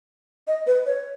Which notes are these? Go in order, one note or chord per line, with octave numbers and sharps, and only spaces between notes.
D#5
B4
C#5